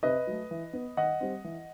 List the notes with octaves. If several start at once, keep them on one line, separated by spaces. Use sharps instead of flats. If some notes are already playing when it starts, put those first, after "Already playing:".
C3 B4 D#5
F#3 A3
E3
B3
D#3 D#5 F#5
G3 C4
E3